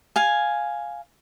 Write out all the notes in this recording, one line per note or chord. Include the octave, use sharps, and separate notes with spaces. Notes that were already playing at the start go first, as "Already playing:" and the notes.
F5 G#5